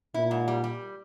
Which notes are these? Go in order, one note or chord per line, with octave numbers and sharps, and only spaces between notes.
A#2 E4
G#2
G3
G3